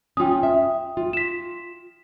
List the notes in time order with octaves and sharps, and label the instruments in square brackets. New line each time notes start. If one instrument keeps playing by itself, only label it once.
[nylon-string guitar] C#4 F4 [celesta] G5 D#6
[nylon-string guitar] E5
F4
[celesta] B6 E7